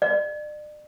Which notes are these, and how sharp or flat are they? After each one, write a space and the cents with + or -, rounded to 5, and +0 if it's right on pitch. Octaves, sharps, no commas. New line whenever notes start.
D5 +40